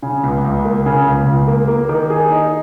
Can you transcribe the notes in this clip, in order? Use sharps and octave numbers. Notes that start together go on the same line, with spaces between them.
C#3
C#2
C#2
A#3
C#3
C#2
C#2
A#3
A#3
D#3
G#4
D#4